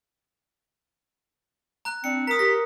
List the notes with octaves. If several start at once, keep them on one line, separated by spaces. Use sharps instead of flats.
A#5 F#6
C4 D4 C#7
A#4 A#5 D#6 B6
G4 A#6